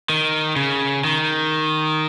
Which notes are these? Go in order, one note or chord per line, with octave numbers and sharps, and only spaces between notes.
D#3
C#3
D#3